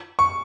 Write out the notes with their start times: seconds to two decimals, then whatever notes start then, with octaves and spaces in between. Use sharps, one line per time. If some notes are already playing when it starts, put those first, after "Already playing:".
0.19 C#6